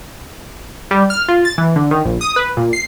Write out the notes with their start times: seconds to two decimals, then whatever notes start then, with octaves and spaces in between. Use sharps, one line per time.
0.91 G3
1.10 F6
1.28 F4
1.45 A6
1.58 E3
1.76 D3
1.91 D#3
2.05 A#1
2.21 D#6
2.36 B4
2.57 A#2
2.73 C7